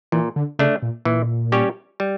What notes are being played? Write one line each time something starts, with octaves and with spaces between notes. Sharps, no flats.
A#2 E3
D3
C#3 A3 D4
A#2
A#2 E3
G3 C#4 G4 C#5
G3